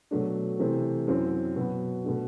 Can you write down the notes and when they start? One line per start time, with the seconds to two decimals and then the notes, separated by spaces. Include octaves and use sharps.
0.11 B2 F#3 A3 D4
0.59 C3 E3 A3 C4
1.07 F#2 F#3 C4 E4
1.56 B2 F#3 B3
2.04 B2 A3 D4